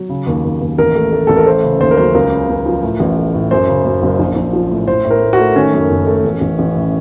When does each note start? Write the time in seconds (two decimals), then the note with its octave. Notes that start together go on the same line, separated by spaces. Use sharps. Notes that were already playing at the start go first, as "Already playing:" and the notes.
Already playing: F#3
0.09 C#3
0.27 D#2
0.44 D#2
0.61 D#2
0.78 A1 A#4
0.95 A3
1.12 A3
1.27 A1 A4
1.37 A#4
1.46 A3 C5
1.64 C#3
1.80 D#2 C5
1.91 A#4
1.98 F#3 C5
2.14 C#2 A#4
2.32 C#3
2.49 C#2
2.66 F3
2.83 A2
3.00 A1
3.17 A3
3.34 A2
3.51 F#2 C5
3.69 C#3
3.85 F#2
4.03 F#1
4.19 A#1
4.37 A#1
4.53 F3
4.71 A2
4.88 A2 C5
5.05 A2
5.11 A#4
5.22 A3
5.33 F#4
5.39 A3
5.56 D#3 C#4
5.73 F#2
5.90 F#1
6.07 A3
6.24 A1
6.41 A1
6.59 A1
6.75 A2